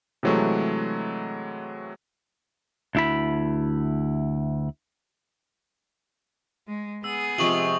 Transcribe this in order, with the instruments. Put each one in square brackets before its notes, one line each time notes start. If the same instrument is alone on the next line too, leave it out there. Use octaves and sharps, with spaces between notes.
[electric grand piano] C3 E3 F#3 G#3 A3
[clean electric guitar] D2 E4 B5
[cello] G#3
[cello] B3 G#4 [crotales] E6
[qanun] C3 F3 G#3 [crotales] C#6 D#6 F#7